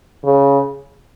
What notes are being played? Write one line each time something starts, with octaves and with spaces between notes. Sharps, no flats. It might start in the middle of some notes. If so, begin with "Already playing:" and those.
C#3